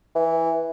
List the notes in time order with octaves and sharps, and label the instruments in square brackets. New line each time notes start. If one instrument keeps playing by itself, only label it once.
[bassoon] E3